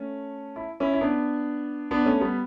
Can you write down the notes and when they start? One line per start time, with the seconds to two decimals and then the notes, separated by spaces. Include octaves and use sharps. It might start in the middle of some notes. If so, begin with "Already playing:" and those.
Already playing: A3 C#4
0.56 E4
0.80 C#4 E4
0.93 E4
1.01 B3 D4
1.91 B3 D4
2.06 A3 C#4
2.21 G3 B3